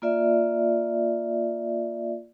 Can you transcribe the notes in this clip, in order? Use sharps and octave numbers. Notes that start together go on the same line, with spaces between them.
A#3 F4 D5 E5